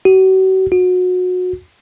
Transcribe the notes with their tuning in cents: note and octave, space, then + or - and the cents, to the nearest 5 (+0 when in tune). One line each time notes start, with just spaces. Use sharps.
F#4 +40
F#4 -25